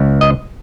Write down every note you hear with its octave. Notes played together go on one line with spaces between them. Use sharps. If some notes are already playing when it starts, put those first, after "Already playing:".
Already playing: C#2
D#5